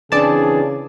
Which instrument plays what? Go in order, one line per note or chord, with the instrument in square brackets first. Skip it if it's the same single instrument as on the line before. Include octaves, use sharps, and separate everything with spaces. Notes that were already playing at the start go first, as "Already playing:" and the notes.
[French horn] C#3 [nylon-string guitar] E3 C4 D4 [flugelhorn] G#4 [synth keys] D5 A5